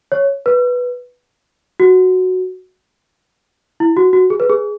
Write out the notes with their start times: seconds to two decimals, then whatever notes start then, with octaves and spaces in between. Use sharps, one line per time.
0.12 C#5
0.46 B4
1.80 F#4
3.80 E4
3.97 F#4
4.13 F#4
4.30 G#4
4.40 B4
4.50 G#4